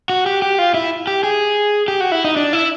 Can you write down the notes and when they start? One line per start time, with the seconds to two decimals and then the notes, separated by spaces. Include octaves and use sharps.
0.09 F#4
0.26 G4
0.42 G4
0.59 F4
0.74 E4
1.07 G4
1.23 G#4
1.88 G4
2.01 F#4
2.12 E4
2.25 D#4
2.36 D4
2.53 E4